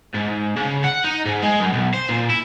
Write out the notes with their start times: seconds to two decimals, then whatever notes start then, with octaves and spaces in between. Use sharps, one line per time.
0.14 G#2
0.56 C#3
0.84 F#5
1.04 D#4
1.26 G#2
1.43 G#3
1.60 F#2
1.73 B1
1.93 C5
2.09 A#2
2.30 E4